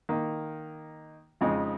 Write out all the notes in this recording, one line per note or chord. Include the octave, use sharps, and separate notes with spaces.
D#3 A#3 D#4
F2 C#3 G#3 D#4